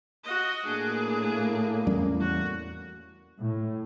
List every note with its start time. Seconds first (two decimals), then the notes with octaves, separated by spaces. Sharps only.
0.24 F#4 D#5
0.66 A2 A#3 D4 G#4
1.87 E2 G3 C#4
2.21 F#4
3.39 A2